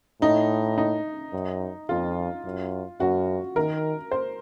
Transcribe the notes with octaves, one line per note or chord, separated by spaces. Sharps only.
A2 D#4
D#4
F#2
F2 F4
F#2
F#2 F#4
D#3 A#4
C5